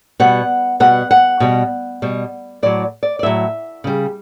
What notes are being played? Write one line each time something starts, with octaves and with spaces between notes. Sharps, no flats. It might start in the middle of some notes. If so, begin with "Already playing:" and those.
B2 G3 F#5
B2 G3 F#5
F#5
B2 G3
B2 G3
A2 F#3 D5
D5
D5
A2 F#3 E5
C#3 G3